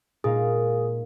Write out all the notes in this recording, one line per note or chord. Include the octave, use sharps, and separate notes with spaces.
A#2 G#3 D#4 G#4 A#4 F5